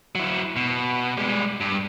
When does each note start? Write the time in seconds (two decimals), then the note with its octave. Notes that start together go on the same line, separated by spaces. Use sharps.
0.15 F#3 E4
0.56 B2
1.17 G3 G#3
1.60 G2